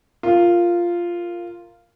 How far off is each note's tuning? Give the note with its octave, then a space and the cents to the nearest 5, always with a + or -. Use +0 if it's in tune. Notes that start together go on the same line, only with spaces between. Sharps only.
F4 -5 A#4 -15